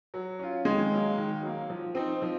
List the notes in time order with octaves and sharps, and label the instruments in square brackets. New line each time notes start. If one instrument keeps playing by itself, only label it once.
[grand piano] F#3
C#4 F4
[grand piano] D#3 [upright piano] G#3
[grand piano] F#3 A#3
D#3
F#3 A#3
F3
C4 D#4
F3